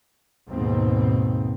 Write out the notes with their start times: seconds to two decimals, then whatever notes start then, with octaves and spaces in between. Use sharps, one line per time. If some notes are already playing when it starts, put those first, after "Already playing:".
0.49 D#2 G#2 B2 C4